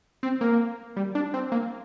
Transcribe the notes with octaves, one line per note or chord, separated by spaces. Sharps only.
C4
A#3
G3
D4
C4
A#3